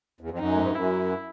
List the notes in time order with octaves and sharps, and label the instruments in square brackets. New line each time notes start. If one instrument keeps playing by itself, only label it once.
[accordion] E2
F2
[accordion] F#2 [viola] D#4
[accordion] A2
G#2
G2
[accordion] F#2 [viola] E4